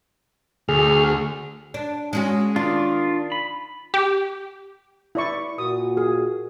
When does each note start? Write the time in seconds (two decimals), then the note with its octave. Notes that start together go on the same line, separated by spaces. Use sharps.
0.69 D2 G#4 F6
1.74 D4
2.13 G#3 C#4 F#4
2.56 D#3 D4 F4
3.32 B5
3.94 G4
5.15 E4 D5 C#6
5.58 A#2 F#4 D#6
5.97 G#4